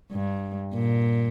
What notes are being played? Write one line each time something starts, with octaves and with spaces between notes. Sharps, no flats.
G2
A#2